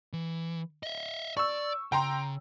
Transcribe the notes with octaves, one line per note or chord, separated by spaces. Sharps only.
E3
D#5 E5
D5 C#6 E6
C#3 G5 A#5 C6